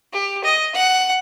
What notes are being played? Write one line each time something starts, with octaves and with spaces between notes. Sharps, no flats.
G4
D#5
F#5